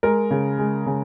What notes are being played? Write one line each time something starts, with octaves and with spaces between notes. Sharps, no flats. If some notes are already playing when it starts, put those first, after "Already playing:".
G#3 A#4
C#3
G#3
C#3